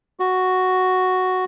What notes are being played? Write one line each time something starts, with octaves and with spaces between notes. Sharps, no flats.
F#4